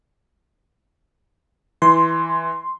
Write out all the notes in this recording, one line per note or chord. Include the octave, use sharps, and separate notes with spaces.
E3 C6